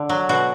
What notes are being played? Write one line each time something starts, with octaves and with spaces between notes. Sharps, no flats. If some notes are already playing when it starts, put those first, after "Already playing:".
Already playing: D3
F#3
B2 F#4